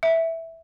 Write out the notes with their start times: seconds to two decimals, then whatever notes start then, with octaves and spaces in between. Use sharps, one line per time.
0.03 E5